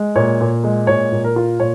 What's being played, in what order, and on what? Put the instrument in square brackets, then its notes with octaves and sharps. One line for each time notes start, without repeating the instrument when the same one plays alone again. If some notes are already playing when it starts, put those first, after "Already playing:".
Already playing: [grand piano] G#3
A#2 C#5
A#2
G#3
A#2 C#5
A#2
A#4
F4
A#2 C#5